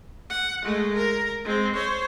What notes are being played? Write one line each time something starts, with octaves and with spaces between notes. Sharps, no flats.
F#5
G#3 A3
A#4
G#3 C4
C5 C#5